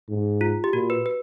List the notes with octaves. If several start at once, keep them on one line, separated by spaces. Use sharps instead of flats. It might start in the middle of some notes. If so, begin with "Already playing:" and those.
G#2
F4
G4
A#2 F#4
B4
B4